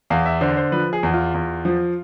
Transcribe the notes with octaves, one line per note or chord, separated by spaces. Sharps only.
E2 F5
E5
D3 C5
C5
F3 B4
G#4
E2
F4
E2
F3